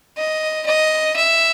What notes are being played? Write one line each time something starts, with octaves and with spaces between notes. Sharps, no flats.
D#5
D#5
E5